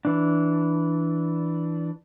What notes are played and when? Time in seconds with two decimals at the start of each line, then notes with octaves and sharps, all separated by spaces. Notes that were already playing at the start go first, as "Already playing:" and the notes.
0.05 E3 D4